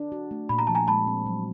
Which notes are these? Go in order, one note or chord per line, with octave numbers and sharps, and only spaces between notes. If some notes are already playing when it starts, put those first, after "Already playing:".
Already playing: D4
F#4
A3
A#2 B5
A#5
F3 A5
G#5 A#5
G#3 A5 B5
C4
F#3